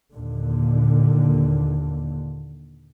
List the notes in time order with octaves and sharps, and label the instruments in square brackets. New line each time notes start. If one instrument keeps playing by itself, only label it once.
[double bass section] D#2 A#2 D3